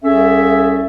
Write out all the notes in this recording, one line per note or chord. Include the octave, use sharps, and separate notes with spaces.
C2 C#4 G#4 A4 E5